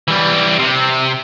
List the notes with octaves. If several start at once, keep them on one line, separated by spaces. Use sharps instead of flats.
E3 G3
C3